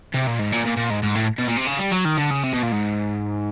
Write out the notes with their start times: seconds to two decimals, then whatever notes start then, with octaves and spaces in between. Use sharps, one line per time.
0.14 C3
0.27 A#2
0.39 G#2
0.52 A#2
0.65 A#2
0.77 A#2
0.90 G#2
1.03 G#2
1.15 A2
1.39 B2
1.48 A#2
1.57 C3
1.67 C#3
1.79 G3
1.92 F#3
2.05 D#3
2.18 D3
2.31 C#3
2.44 C3
2.53 B2
2.62 A#2
2.72 G#2